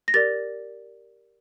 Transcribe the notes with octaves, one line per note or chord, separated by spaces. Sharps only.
A#6
G4 A#4 D5 A6